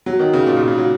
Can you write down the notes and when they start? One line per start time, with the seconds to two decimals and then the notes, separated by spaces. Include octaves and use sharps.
0.06 F#3
0.19 D#3
0.33 C#3
0.47 A#2
0.57 A#2
0.67 C#3
0.78 F#3